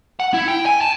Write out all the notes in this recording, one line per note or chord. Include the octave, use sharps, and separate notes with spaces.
F#5
E4
G5
G#5
A5